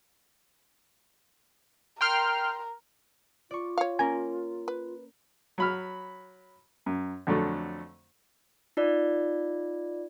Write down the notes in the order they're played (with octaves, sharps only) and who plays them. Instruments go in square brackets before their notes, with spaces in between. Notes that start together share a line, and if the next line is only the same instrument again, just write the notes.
[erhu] A#4 [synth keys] G5 C6 F6
[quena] F4 [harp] D5 C#6
[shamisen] C#5 F5
[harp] A#3 C#4 A#4 [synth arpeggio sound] G#5
[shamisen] B4
[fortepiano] F#3 B5 F6
F#2
F2 D3 F#3 A3
[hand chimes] D#4 F4 D5